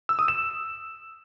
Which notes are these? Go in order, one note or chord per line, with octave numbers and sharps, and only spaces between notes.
E6
D#6
E7